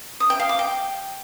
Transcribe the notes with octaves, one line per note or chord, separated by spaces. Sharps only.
D#6
G5
F5
D6
G5